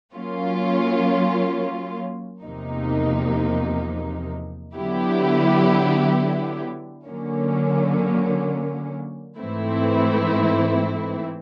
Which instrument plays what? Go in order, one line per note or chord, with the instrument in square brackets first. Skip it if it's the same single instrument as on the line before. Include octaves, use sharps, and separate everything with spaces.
[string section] F#3 A#3 C#4 F4
E2 C3 F3 A#3 D#4
D3 F#3 B3 E4 G4
D3 F#3 A#3 C#4
G#2 E3 A3 C4 E4